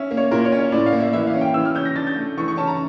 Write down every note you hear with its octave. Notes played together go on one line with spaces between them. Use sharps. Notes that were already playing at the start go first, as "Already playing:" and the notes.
Already playing: C#4 E5
A#3
C#5
A#2 A#4
C#5
C#4
C#5
A2 D5
F5
A#3
E5
E3 E5
F5
C#4
G5
E3 E6
F6
C#4 G6
A#6
D4 A6
G6
A3
E3 C#6
C#6
C#4 A5
A#5